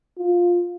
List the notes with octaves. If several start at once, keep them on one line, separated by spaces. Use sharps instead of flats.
F4